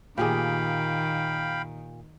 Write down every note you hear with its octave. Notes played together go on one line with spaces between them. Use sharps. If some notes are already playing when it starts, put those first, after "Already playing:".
A#2 D#3 G4 G#4 F5 G5 B5